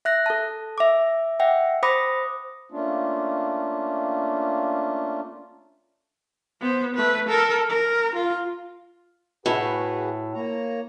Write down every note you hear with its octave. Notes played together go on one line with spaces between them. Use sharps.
E5 F#6 A#6
A4 A5
E5 D6
E5 F#5 G5
C5 B5 D6 D#6 A#6
A3 A#3 C#4 D4 F4
B3 C5
A3 B4
A4 A#4
A#4
F4
A2 F#4 G#4 B4
A#3 C#5 A#5